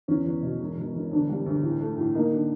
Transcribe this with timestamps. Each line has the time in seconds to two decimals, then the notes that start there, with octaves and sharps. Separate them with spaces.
0.08 E2 C#4
0.25 E2
0.43 B2
0.60 E1
0.77 E1
0.94 E1
1.11 D2 D4
1.29 G3
1.46 D2
1.63 A2
1.80 A3
1.98 A2
2.15 A#3 D#4
2.31 D3